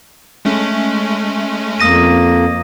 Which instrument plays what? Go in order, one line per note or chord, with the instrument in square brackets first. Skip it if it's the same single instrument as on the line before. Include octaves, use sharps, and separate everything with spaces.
[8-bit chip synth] G#3 A3 C#4
[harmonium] F2 A#3 [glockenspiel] D#6 A#6 D#7